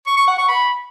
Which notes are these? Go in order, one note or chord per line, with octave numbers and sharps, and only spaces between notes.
C#6
C#6
F#5
C#6
B5